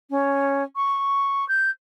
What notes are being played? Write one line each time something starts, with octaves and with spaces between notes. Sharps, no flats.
C#4
C#6
G6